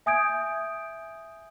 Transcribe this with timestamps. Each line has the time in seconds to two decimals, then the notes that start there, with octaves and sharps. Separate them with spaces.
0.06 E5 G#5 D#6 G6 G#6 D7